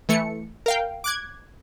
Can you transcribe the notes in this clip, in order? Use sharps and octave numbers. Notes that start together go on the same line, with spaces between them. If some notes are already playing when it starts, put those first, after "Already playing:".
E3 A3 C#7
A#4 F5 G5
D6 F#6 G#6